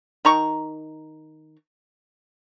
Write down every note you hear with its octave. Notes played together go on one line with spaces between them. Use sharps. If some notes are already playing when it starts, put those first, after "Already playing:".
D#3 A#5 C#6